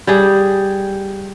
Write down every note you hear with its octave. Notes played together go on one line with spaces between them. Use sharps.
G3 G4 G#4